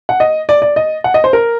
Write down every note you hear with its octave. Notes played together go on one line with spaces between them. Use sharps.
F#5
D#5
D5
D5
D#5
F#5
D#5
C5
A#4